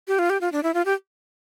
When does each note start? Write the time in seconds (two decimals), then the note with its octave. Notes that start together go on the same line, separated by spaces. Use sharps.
0.08 G4
0.19 F4
0.30 G4
0.41 F4
0.52 D4
0.63 E4
0.74 F4
0.85 G4